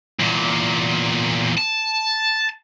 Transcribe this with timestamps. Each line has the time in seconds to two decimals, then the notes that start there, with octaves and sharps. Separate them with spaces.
0.20 E2 A#2
1.58 A5